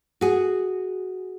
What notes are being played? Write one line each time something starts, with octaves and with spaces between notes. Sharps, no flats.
F#4 G#4